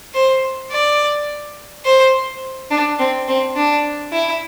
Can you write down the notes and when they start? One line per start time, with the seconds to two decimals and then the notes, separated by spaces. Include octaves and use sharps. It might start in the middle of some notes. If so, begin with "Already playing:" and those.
0.14 C5
0.71 D5
1.85 C5
2.71 D4
2.99 C4
3.28 C4
3.56 D4
4.13 E4